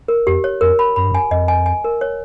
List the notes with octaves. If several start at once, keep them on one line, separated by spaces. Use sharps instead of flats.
A#4
F2 G4
C#5
F2 A#4
B5
F#2 B5
G2
F#2
G#5
F2 D#5
G#5
G#5
A#4
C#5